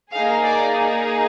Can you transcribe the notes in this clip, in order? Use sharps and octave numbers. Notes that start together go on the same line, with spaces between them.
A#3 D#4 G#4 F5
D5